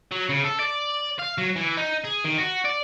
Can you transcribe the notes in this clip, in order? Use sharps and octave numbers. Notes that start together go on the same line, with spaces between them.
F#3
C#3
A4
D5
F5
F#3
E3
D#4
G#4
D#3
F#4
D5